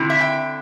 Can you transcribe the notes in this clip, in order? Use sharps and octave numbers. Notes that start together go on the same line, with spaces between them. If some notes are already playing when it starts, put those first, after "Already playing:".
Already playing: D3 C4 E4
E5
G5